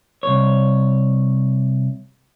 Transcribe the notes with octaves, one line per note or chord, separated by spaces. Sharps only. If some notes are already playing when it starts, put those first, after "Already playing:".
C2 C#5